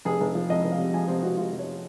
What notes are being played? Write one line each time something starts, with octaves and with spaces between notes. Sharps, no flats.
F1 G#4
F1
F3
F2 D#5
F1
F5
C3
F3 G#5
C3 C5
C3 F#4
C3 F4
F1
C#5